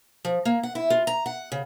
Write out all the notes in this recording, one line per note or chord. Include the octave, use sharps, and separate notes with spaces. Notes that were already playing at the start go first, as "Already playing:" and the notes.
F3
A#3
F#5
E4
F4
A#5
F#5
C#3